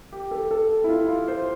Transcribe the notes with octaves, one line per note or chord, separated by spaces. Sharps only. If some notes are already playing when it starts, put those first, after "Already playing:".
G4
A4
A4
E4
F4
F4
C5